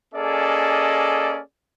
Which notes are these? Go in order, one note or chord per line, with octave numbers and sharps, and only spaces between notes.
A#3 C#4 G#4 A4 D5 D#5